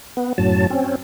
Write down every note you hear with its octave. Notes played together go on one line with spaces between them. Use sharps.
B3
F#2 A2 F#3 A5
C4 C#4